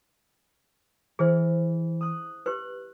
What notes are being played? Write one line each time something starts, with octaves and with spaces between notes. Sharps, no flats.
E3 G#4 C5
D#6 F#6
G4 B4 F#6